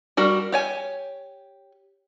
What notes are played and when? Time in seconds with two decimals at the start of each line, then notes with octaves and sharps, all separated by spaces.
0.17 G3 F#4 A#4
0.52 G4 C#5 G#5